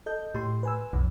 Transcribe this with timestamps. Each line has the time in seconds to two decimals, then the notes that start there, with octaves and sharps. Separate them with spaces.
0.06 A4 D#5 G6
0.35 A2 G4 C6
0.63 B4 G#5 E6
0.93 B1 F2